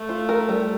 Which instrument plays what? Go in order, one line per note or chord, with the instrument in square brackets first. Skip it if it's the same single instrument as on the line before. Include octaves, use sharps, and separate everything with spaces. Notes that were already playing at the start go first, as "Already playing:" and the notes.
Already playing: [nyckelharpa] A3
[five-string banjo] F4
A#4
G3